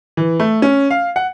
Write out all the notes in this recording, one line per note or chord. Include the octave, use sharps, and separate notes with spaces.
E3
A3
C#4
F5
F#5